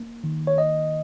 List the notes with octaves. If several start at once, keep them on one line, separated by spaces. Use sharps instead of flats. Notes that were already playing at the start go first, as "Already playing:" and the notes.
Already playing: A#3
D#3
C#5
A#3 D#5